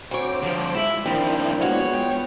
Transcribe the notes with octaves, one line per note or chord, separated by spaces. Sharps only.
D2 C4 C5 C#5 D6
D3 F3
G#3 E4 E5
D#3 F3 G3 A#3 C4 D4 E4 C5
G#3 A#3 B3 F4 F#4 C#5
G5